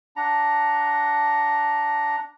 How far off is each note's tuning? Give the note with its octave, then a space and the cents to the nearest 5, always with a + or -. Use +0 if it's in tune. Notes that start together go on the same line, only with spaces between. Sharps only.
D4 +0 F#5 +0 A#5 +5